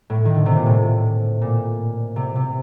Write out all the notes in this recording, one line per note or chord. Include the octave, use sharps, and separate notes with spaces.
A2
D#3
D3
C3
A#2
A2
A#2
C3
C3